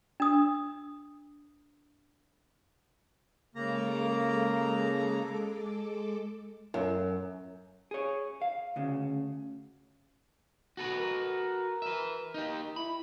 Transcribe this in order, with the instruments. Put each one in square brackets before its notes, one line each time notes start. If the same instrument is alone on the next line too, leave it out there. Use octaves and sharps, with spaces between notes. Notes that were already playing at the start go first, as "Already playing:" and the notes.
[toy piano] D4 D#6
[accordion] C#3 A#3 A#5 [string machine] G#3 A4 D6
[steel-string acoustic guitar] F#2
[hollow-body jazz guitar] G#4 C#5
F5
D2 C#3
[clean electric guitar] F#4 A4 B4
[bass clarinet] A#4
[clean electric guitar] B4 E5
D#4 G4
[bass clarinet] E4 [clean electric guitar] B5